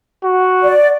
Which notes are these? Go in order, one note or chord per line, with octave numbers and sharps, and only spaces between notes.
F#4
D5